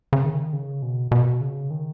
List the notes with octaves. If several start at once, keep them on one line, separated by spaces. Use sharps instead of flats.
C#3
D#3
C#3
B2
B2
C#3
D#3